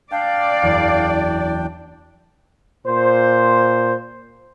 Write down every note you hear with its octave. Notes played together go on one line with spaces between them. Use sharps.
D4 D5 F5 G5
F#1 E2
A#2 C5